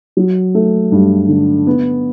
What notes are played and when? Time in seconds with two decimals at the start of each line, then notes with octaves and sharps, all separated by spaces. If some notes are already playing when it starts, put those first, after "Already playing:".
0.17 F#3
0.55 A3
0.92 G2
1.28 D3
1.67 B3